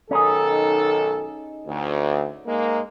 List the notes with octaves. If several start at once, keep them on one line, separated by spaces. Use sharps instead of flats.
B1 D#3 C#4 D#4 G#4 A4
D2
G#2 G#3 A#3